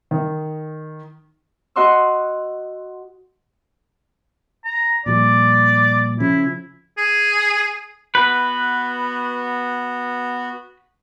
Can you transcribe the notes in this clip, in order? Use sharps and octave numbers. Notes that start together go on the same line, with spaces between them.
D#3
F#4 D#5 F#5 C6 C#6 E6
A#5
A#2 F3 G3 D5
C#3 F3 E4
G#4
B3 F#4 B4